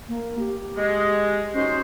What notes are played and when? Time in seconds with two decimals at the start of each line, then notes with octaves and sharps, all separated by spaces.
0.08 A#3
0.39 G4
0.76 G#3
1.54 C#4 D#4 F#4 C5